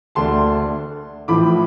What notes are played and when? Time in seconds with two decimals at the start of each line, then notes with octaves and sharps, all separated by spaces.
0.15 D2 D3 A3 D4 A5 C6
1.28 A1 A2 F3 B5 D6